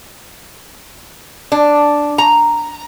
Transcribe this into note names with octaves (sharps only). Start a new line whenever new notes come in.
D4
A#5